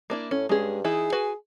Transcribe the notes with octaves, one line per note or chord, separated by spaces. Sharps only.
A#3 D4 E4
A2 C#4
G2 G#3 C#4 G#4
E3 D#4 E4 G#4
F#4 B4 G#5